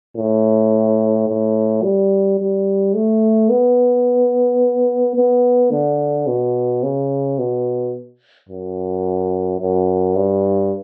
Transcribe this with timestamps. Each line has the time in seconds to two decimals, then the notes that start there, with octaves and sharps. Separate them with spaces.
0.17 A2
1.29 A2
1.83 G3
2.40 G3
2.94 A3
3.50 B3
5.16 B3
5.72 D3
6.27 B2
6.83 C#3
7.39 B2
8.49 F#2
9.60 F#2
10.16 G2